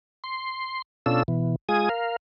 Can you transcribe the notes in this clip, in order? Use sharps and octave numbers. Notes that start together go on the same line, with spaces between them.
C6
B2 C#4 D4 F4 A4 E6
B2 E3
G#3 F4 G#4 G#5 D#6
A#4 F5